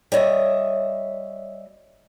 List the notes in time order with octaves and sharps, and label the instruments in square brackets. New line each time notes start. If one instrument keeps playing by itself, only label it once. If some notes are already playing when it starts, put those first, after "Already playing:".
[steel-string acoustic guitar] G3 C#5 D#5 E5